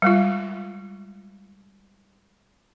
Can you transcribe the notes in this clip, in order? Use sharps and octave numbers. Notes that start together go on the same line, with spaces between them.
G3 G#3 F4